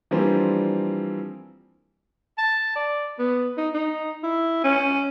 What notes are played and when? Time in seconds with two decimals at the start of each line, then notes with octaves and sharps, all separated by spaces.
0.11 E3 F3 G3 A#3 C4 D4
2.38 A5
2.76 D5
3.19 B3
3.58 D#4
3.74 D#4
4.23 E4
4.64 C#4